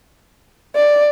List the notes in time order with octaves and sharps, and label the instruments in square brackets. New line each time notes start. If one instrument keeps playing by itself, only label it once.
[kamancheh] D5